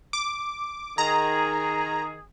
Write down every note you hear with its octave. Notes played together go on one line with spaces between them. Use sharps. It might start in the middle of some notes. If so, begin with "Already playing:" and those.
D6
D#3 G#4 A#5